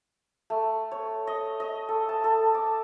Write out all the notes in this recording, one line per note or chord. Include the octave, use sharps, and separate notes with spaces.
A3
C#5
D#5
D#5
A4
A5
A4
D6